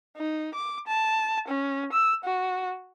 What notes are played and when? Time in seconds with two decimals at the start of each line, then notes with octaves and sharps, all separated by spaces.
0.17 D#4
0.55 D6
0.87 A5
1.48 C#4
1.92 E6
2.24 F#4